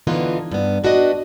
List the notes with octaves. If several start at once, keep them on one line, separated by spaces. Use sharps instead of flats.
D3 E3 B3 D#4 F4
G2 B3
D4 F#4 B4 D#5